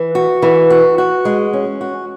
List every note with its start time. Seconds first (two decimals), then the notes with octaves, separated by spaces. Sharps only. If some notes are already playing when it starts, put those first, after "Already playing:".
Already playing: E3
0.15 F#4
0.42 E3
0.70 F#4
0.98 F#4
1.25 G#3
1.53 C#4
1.81 F#4